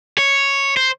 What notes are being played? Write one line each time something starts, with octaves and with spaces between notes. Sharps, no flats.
C#5
C5